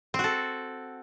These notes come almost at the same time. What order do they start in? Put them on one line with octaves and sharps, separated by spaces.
C4 F#4 A4